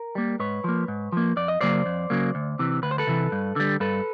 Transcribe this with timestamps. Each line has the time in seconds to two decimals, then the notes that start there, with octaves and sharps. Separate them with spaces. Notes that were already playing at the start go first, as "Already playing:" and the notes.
Already playing: A#4
0.15 G3 A#3
0.39 G#2 B4 C#5
0.64 F3 A#3
0.88 G#2
1.12 F3 A#3
1.37 F2 D5
1.48 D#5
1.61 C#3 F#3 A#3 C5 D5
1.86 F2
2.10 C#3 F#3 A#3
2.35 D2
2.59 C3 E3
2.83 D2 B4
2.91 C5
2.98 A4 B4
3.07 C3 E3
3.32 G2
3.56 D3 G3
3.80 G2 A4 B4